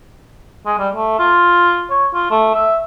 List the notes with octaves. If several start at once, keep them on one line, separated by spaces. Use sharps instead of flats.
G#3
G3
A3
F4
C#5
F4
A3
E5